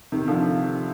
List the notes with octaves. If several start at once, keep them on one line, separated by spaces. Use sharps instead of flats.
C3 D#3
D3 F3